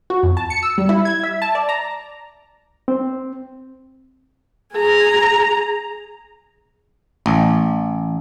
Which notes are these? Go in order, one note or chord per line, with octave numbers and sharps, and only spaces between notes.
F#4
F2
A5
C#7
E6
G3
E4
G#6
E5
A5
D5
A#5
C4
G#4 A#5
A1